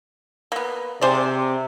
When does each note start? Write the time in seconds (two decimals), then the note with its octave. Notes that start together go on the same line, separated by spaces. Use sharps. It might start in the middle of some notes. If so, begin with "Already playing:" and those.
0.52 A#3 B3
1.01 C3 G#4 C5 D5